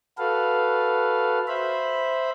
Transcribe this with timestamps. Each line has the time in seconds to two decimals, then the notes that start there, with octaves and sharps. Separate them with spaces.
0.18 F#4 A4 B4 F5
1.48 C5 E5 B5